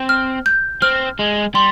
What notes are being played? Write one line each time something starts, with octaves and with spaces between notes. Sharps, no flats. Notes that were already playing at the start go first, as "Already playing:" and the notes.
Already playing: C4
F6
G6
C4 F6
G#3
G3 C6